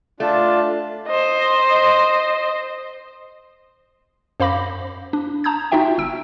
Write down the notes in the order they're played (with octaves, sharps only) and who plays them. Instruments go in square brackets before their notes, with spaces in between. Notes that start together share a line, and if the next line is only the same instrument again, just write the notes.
[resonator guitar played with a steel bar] A3 [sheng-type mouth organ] D4 F4 A5
[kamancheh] C5 D#5
[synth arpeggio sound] F#2 C5 F5 B5 D6 A#6
D4
A5 A#5 D#6 G6 G#6
D#4 F4 F#4 E5 G5
G1 E6 D7